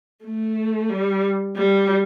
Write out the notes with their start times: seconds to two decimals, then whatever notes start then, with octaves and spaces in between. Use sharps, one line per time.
0.25 A3
0.90 G3
1.56 G3